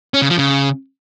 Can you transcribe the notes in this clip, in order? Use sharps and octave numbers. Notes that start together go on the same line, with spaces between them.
C#4
C#3
F3
C#3